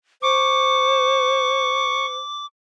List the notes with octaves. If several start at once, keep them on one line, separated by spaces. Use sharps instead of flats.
C5 C#6 D6